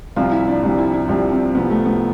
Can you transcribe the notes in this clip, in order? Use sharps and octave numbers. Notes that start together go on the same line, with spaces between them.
C2 C3 F3 F4
E4
D4
C2 C3 F3
E4
E4
C2 C3 F3 D4
C4
C2 C3 F3 B3
A3
B3